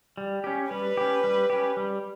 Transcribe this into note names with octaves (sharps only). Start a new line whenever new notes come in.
G3
C#4 G4
G3 B4
C#4 G4
G3
C#4 G4
G3